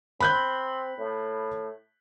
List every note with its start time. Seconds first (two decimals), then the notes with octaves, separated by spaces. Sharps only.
0.20 C4 B5 F#6 G6
0.98 A2